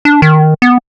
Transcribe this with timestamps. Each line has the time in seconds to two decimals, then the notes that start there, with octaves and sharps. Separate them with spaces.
0.05 D4
0.22 D#3
0.62 B3